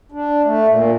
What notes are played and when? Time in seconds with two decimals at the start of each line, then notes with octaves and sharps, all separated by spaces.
0.12 D4
0.45 A3
0.68 A#2